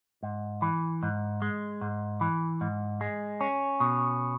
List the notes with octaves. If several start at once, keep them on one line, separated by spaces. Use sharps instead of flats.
G#2
E3
G#2
G#3
G#2
E3
G#2
G#3
C#4
B2